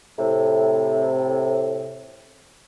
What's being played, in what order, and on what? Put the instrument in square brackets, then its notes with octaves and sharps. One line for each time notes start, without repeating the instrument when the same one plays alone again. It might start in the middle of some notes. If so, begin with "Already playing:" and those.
[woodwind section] A2 C3